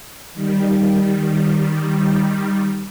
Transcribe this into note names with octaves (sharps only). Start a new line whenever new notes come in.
D#3 G3